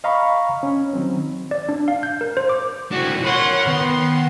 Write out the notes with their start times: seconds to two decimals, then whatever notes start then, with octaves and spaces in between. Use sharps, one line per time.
0.04 D#5 F5 A#5 B5 C#6
0.63 C#4
0.93 D#3 F#3 C4
1.51 D5
1.69 D4
1.88 F5
2.03 G6
2.21 A#4
2.37 C5
2.49 D6
2.92 E3 D4 F#4
3.25 A#4 C#5 F#5 B5 C6
3.67 D#3 B3 C6